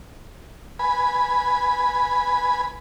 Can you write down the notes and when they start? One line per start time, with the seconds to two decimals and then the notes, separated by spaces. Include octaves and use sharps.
0.79 B4 G#5 B5